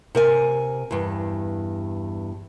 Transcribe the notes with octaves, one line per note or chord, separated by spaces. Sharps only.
C3 A#4 G#5
E2 G2